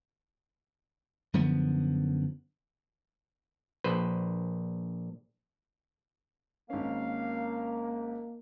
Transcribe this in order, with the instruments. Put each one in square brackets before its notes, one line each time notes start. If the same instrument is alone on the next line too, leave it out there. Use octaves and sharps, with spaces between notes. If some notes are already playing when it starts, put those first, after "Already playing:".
[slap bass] F#2 D3 F3 B3
[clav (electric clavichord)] A#1 B4 C5
[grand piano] G#1 C#4 [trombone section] A#3 [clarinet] F5